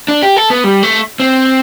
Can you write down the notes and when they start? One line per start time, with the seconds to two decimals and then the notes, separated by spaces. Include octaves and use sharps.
0.08 D4
0.23 G4
0.37 A4
0.50 B3
0.64 G3
0.83 A3
1.20 C4